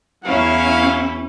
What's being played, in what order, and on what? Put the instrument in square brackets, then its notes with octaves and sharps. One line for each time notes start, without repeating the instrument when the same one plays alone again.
[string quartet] E2 E4 [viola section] F#3 C#5 [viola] C#4 [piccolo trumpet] F5